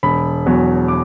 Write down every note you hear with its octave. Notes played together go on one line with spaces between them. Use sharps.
E1 B5
E2 B2 F#3
D6